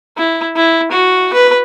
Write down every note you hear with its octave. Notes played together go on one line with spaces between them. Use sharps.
E4
E4
F#4
B4